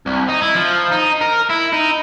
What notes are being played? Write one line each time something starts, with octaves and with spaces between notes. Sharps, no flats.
C2
D#4
E4
F3
D#4
A#4
E4
D#4